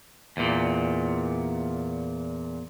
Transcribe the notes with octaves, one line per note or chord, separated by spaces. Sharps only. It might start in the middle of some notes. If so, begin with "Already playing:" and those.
E2 A#2